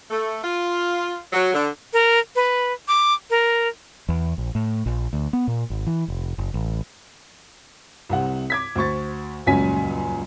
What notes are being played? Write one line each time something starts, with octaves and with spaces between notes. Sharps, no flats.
A3
F4
F#3
D3
A#4
B4
D6
A#4
E2
A#1
A2
A#1
D2
B3
A#2
G#1
E3
F1
F#1
A1
C2 C3 F#5
D6 G#6 B6
D2 C5 C#6 A6
D#1 C#2 F#2 C#4 G#5 B6